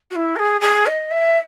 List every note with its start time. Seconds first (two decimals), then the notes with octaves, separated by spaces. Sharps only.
0.11 F#4
0.16 E4
0.36 A#4
0.39 G#4
0.61 G#4
0.86 D#5
1.11 E5